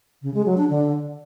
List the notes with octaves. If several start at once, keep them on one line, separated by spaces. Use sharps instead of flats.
C#3
G#3
F#3
D4
D3